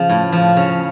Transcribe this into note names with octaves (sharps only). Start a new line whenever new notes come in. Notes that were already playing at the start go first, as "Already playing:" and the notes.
Already playing: C#3 F3
A2
F3
C#3